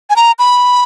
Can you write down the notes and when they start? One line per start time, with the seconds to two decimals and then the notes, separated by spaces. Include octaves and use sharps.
0.10 G#5
0.16 A#5
0.39 B5